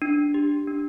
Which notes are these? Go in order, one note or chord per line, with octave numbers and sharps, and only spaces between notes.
D4
G4
D4